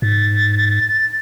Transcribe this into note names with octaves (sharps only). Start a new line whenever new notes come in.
G#2 A6